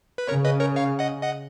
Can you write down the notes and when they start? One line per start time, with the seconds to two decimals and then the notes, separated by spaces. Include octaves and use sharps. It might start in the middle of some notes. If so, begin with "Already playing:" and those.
0.18 B4
0.28 C#3 A#4 C#5
0.45 B4 D#5
0.60 A#4 C#5
0.76 C#5 F5
0.99 D#5 F#5
1.23 D#5 F#5